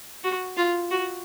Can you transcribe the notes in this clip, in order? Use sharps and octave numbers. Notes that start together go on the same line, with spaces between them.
F#4
F4
F#4